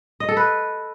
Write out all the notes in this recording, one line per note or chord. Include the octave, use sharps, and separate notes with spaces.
D#5
A4
B4